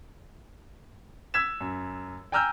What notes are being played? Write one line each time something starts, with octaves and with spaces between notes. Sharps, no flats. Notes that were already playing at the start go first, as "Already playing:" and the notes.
E6 G#6 B6 E7
F#2
G5 G#5 A#5 E6 F6 G6